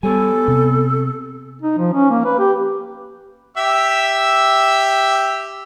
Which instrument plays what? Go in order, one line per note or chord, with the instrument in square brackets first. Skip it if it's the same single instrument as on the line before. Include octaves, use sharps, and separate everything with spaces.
[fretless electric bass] G3 [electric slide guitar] B3 C#5 G#5 [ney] A4
[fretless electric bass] C3
[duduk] D#4
F3
C#4
A#3
B4
G4
[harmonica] G4 E5 E6